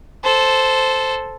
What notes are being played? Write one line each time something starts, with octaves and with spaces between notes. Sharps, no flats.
A4 C5